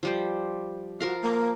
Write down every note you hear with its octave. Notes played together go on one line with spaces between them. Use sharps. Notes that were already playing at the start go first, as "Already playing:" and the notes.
F3 G3 C5
F3 F#4 A#4 F5
A#3